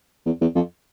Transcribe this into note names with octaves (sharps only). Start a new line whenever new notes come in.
E2
E2
F2